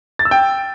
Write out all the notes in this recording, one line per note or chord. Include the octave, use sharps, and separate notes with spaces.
A6
E6
G5